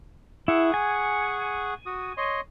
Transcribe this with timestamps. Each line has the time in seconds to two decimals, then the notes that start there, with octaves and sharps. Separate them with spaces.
0.48 E4 G#4 F#5 C#6
0.74 G#5
1.86 F#4 D#6
2.17 C#5 D#5 C6